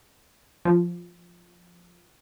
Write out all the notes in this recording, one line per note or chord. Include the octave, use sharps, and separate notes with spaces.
F3